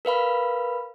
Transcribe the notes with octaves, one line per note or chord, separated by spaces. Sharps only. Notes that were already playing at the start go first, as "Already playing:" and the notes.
A#4 B4 F5 B5